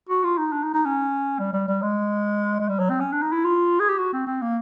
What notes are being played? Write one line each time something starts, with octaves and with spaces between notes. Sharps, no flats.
F#4
F4
D#4
D4
D#4
D#4
C#4
G3
G3
G3
G#3
G#3
G3
F#3
C4
C#4
D4
D#4
E4
F4
G#4
G4
F#4
C4
C4
A#3